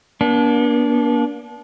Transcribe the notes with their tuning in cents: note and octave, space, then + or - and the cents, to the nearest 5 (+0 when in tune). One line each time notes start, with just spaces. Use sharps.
A#3 +40 D4 -25